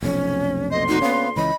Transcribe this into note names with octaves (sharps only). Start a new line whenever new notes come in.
F1 B1 F2 C#4
D2 A#3 D#5 C6
D#4 F#4
B3 C#4 F5
C#2 E3 C#4 D#5 B5